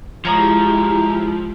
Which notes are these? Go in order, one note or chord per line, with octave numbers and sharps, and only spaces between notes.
F3 G#3 E4 G4 C#5 A#5 D#6